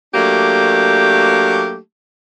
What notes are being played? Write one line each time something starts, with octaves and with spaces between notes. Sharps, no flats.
F#3 A3 A#3 D4 G4